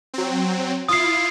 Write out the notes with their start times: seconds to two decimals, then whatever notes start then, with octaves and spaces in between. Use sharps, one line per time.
0.14 F#3 C4
0.89 E4 F4 D#6 C7